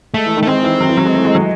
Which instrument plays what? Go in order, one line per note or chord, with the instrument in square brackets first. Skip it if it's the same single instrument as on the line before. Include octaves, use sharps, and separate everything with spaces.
[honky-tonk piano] G#3 [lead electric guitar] A3
[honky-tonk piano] E3
D#3
[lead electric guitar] A3
[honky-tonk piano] G#3 [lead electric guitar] C4
[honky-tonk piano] E3
F#3
E3
F#3
G#3
A3
G#3
F#3